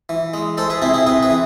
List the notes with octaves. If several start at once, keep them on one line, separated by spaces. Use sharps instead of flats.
E3
G#3
G#3 A4 C5
G#4 B4
C3 E4 G#4
E4 G#4
C3 G#4 B4
G#4 B4
E3